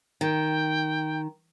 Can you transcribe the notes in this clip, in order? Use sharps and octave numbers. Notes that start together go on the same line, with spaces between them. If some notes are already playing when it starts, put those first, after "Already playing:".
D#3 G5